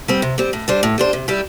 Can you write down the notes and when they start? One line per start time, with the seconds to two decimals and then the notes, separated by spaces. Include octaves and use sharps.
0.08 G3 C4
0.22 C3
0.38 G3 C4
0.53 A2
0.68 G3 D4 C5
0.83 A2
0.98 G3 D4 C5
1.13 C3
1.28 G3 E4 G4